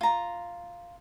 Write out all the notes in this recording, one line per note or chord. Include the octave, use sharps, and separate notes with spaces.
F4 A#5